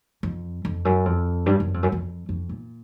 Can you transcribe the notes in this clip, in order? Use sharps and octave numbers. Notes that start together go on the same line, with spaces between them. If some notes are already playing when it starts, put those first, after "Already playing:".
F2
F2
F#2
F2
G2
F#2
F2
F#2
F2
F2
A#2